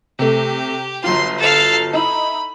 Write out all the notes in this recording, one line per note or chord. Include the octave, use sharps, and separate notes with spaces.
C3 A3 G4
G1 F#3 F4 C6
A4 F5
D#4 E4 B5